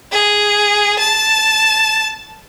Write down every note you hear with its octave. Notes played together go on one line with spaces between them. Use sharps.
G#4
A5